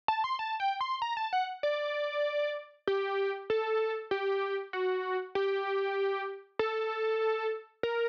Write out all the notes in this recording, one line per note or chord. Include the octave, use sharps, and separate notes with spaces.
A5
C6
A5
G5
C6
A#5
A5
F#5
D5
G4
A4
G4
F#4
G4
A4
A#4